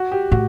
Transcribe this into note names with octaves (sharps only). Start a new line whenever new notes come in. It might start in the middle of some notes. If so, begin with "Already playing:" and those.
Already playing: F#4
G4
A2 F#4